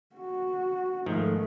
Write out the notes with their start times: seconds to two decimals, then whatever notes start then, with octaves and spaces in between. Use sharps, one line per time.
0.16 F#4
1.06 G#2 D#3 F3 A3